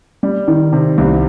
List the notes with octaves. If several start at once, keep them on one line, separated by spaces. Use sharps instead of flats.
G3
D#3
C3
C2